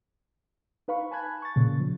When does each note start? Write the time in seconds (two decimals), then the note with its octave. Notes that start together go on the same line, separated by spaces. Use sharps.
0.88 D#4 B4 F5 B5 C#6
1.11 G#5 A5 B5 F#6 G#6
1.42 C#6 A6
1.56 A#2 C#3
1.80 F3